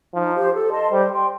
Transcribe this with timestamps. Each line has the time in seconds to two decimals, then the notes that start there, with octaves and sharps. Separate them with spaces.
0.14 F3 D#4
0.34 G4 C5
0.53 A4
0.72 D#5 A5 C6
0.91 G3 C5
1.11 G5 C6